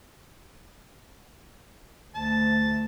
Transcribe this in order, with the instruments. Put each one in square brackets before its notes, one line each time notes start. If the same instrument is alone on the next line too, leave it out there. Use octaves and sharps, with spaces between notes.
[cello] D2 [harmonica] A5